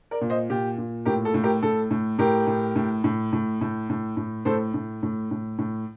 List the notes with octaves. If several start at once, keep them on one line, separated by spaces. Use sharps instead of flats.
A#4 D5
A#2
C5 D#5
A#2 G4
A#2
A2 G4 A#4
A4
A2
G4 A#4
A2 A4
A2
A2 G4 A#4
A2
A2
A2
A2
A2
A2
A2
A2 A4 C5
A2
A2
A2
A2